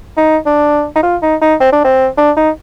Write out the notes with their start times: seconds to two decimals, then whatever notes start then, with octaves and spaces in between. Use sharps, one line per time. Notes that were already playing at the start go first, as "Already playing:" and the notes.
0.17 D#4
0.46 D4
0.96 D#4
1.03 F4
1.22 D#4
1.41 D#4
1.60 C4
1.72 D4
1.84 C4
2.18 D4
2.37 D#4